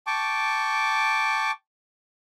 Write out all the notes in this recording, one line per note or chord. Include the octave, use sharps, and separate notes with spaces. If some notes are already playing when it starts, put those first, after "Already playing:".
G5 A5 C#6 D6